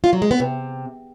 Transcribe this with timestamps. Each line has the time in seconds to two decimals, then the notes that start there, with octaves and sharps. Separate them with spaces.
0.04 F4
0.13 F#3
0.22 G#3
0.31 B3
0.40 C3